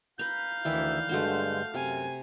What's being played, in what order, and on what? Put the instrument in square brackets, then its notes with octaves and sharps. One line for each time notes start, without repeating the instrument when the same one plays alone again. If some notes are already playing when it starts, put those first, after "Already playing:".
[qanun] B4 A#5 [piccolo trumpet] F5 [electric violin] G6
[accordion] D2 E5 [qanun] D#3 E3 D5
[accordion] G2 D3 G#3 [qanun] A3 F#4 C5
[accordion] F#2 [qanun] C3 [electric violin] G#5